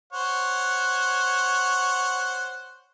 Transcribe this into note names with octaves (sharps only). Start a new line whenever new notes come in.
C5 C#5 F#5